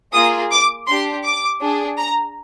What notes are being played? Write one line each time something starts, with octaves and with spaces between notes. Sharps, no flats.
A#3 F4 G#4 D#6
D6
D4 G4 C6
D6
D4 G#4
A#5